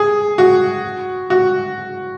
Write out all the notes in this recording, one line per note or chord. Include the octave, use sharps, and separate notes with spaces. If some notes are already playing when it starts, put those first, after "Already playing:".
Already playing: G#4
F#4
F#4